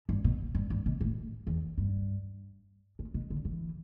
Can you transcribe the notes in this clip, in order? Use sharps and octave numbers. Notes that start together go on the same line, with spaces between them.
G2
B2
G2
G2
B2
A2
E2
G2
A2
B2
D3
E3